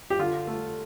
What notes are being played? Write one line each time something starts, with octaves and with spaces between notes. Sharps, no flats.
G4
D3 F4
A3